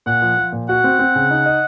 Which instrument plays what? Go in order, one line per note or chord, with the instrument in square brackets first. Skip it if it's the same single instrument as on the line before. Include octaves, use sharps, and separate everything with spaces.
[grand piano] A#2 [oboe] F#5
[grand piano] F3
F3
A#2
[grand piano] F#4 [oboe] F#5
[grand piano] C4
C4
C#3
D#4
D#5